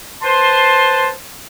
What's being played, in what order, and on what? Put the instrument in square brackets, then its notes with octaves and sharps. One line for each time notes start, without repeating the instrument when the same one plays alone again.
[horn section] B4 C5 A5 C6